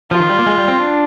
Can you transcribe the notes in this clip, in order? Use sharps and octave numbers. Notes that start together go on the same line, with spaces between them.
F3 F4
D#3
G3
A#3
G#3
G3
C4
D4